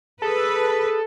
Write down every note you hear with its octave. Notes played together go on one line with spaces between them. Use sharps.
G#4 A4 B4